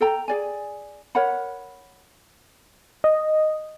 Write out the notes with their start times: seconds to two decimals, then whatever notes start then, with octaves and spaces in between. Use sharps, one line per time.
0.01 A4 G5 A#5
0.28 G#4 D5 G#5
1.15 A#4 C#5 F#5 B5
3.04 D#5